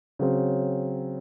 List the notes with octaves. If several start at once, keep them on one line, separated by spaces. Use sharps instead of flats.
C#3 F#3 C4